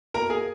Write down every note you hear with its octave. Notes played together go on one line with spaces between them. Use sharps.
B2 A#3 A#4 A#5
G#4 G#5